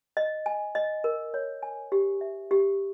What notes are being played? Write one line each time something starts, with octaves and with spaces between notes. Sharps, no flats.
D#5
G#5
D#5
A#4
C#5
G#5
G4
E5
G4